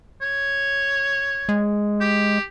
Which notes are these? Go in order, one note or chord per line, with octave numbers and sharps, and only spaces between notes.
C#5
G#3
G4